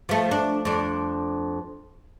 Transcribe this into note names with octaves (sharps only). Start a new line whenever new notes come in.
F3 A3
D4
F2 D4